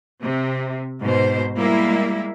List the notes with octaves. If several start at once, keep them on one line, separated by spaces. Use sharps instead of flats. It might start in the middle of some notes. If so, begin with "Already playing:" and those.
C3
G#2 B2 C5
G3 G#3 A#3 E4